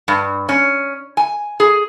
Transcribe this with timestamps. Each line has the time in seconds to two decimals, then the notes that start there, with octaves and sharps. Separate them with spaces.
0.08 G2
0.49 C#4
1.17 G#5
1.60 G#4